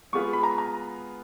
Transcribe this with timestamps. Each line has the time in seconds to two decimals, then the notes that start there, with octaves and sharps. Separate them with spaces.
0.13 G#3 B3 F4 G#4 B4 C#6
0.33 B5
0.43 A#5
0.58 A#5